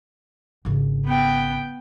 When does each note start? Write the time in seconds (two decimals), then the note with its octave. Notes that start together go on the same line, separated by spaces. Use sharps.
0.65 G#1 C#3
1.05 B3 G5